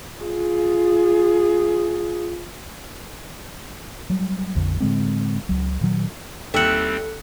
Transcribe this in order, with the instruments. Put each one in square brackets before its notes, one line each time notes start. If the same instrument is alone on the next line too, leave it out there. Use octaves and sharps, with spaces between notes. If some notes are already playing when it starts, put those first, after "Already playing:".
[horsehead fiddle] F4 G#4
[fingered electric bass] F#3 G3
A#1 F2 D3
A2 D3 G#3 C4
C#2 F#3
A#2 D#3 F#3
[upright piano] D#2 [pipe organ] G3 C4 [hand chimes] A4 [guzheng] E5 F#5